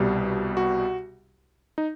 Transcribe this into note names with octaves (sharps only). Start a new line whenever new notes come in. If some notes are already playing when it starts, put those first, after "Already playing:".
Already playing: C2 B2 G3
F#4
D#4